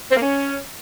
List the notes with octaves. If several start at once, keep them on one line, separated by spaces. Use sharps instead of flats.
C4
A#3
C#4